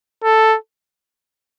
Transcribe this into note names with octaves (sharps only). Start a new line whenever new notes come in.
A4